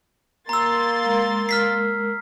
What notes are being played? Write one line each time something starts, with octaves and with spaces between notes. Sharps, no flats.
A#3 A#5 C6 E6 A6
G#3 A#4
F6 B6 C7